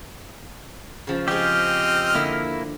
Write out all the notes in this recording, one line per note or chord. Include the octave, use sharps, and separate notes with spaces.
C#3 F3
F3 G#3 C4 G4 D#5 F6
D3 A#3 E4